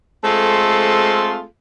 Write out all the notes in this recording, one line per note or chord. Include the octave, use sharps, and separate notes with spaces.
G#3 A3 C4 F4 G#4 A4